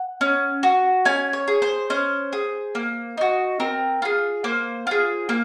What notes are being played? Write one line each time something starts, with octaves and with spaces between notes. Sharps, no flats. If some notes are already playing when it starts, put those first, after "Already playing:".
Already playing: F#5
C#4
F#4
C#4 G#5
C#5
G#4
C5
C#4 C5
G#4
A#3
D#4 F#4
C4 A#4
F4 G#4
A#3 C5
F4 G#4
A#3